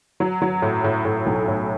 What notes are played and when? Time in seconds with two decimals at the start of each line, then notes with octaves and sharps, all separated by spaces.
0.20 F#3
0.42 F#3
0.62 A2
0.84 A2
1.05 A2
1.26 B1
1.48 A2